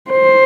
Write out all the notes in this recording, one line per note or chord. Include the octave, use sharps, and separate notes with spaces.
C5